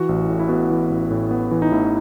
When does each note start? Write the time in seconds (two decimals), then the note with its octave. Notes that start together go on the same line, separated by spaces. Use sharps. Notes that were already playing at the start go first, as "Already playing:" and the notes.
Already playing: E3 F#4
0.09 A1
0.29 A2
0.39 E4
0.49 B3 F#4
0.70 E3
0.90 A1
1.11 A2
1.31 B3
1.51 E3
1.62 D#4
1.72 A1 E4